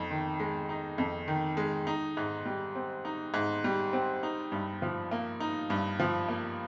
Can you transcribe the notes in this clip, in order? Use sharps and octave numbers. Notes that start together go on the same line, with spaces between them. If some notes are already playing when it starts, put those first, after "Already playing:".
Already playing: F2 D#4
D#3
G#3
D#4
F2
D#3
G#3
D#4
G#2
G3
C4
D#4
G#2
G3
C4
D#4
G2
F3
A#3
D#4
G2
F3
A#3